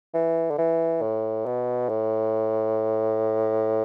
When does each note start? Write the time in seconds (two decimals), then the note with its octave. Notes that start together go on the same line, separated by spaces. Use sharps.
0.14 E3
0.51 D3
0.59 E3
1.02 A2
1.46 B2
1.89 A2